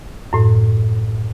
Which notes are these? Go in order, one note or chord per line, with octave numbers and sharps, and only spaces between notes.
F#2 A2